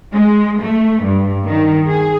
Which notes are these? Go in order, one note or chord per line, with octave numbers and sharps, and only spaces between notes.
G#3
A3
G2
D#3
G#4